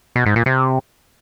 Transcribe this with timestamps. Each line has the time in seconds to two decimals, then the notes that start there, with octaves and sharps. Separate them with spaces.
0.16 B2
0.26 G#2
0.36 A#2
0.46 C3